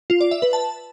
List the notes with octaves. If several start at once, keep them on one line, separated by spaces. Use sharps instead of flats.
F4
D5
E5
B4
A5